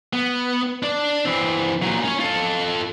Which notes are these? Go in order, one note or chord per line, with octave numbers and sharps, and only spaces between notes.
B3
D4 D5
E3 C4
A#2 F#3
C#4 C#5
F4 A4